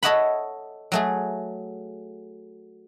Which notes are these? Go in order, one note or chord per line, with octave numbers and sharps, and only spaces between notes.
A4 C#5 D#5 E5 F#5 B5
F#3 A3 G#4